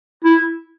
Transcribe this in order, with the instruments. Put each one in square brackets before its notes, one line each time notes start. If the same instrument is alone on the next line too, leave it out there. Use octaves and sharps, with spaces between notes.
[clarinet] E4